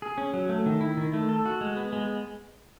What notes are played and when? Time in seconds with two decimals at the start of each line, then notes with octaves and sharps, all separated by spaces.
0.02 G#4
0.18 C#4
0.33 F#3
0.49 A3
0.66 D#3
0.81 E4
0.97 D#3
1.14 A3
1.29 A4
1.45 F#4
1.61 G#3
1.77 B3
1.92 G#3